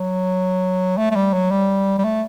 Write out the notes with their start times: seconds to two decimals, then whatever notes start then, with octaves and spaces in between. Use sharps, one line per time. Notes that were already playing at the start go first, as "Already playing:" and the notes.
Already playing: F#3
0.97 A3
1.11 A3
1.15 G3
1.33 F#3
1.51 G3
1.98 G3
2.04 A3